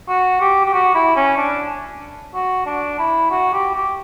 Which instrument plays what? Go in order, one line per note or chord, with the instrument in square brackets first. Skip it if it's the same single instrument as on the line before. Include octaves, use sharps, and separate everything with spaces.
[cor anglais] F#4
G4
G4
F#4
E4
C#4
D4
F#4
D4
E4
F#4
G4
G4